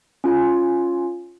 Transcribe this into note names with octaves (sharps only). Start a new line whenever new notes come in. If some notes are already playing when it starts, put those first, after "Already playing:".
C#4 F4 G#5